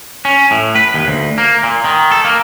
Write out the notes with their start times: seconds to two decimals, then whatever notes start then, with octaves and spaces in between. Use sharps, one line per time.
0.25 C#4
0.51 A2
0.75 B4
0.94 D#2
1.08 D2
1.38 A#3
1.63 A#2
1.84 D#3
2.12 A4
2.25 A#3